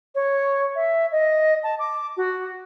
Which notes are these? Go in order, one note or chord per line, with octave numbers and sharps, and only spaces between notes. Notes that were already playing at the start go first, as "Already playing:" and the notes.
C#5
E5
D#5
A5
D6
F#4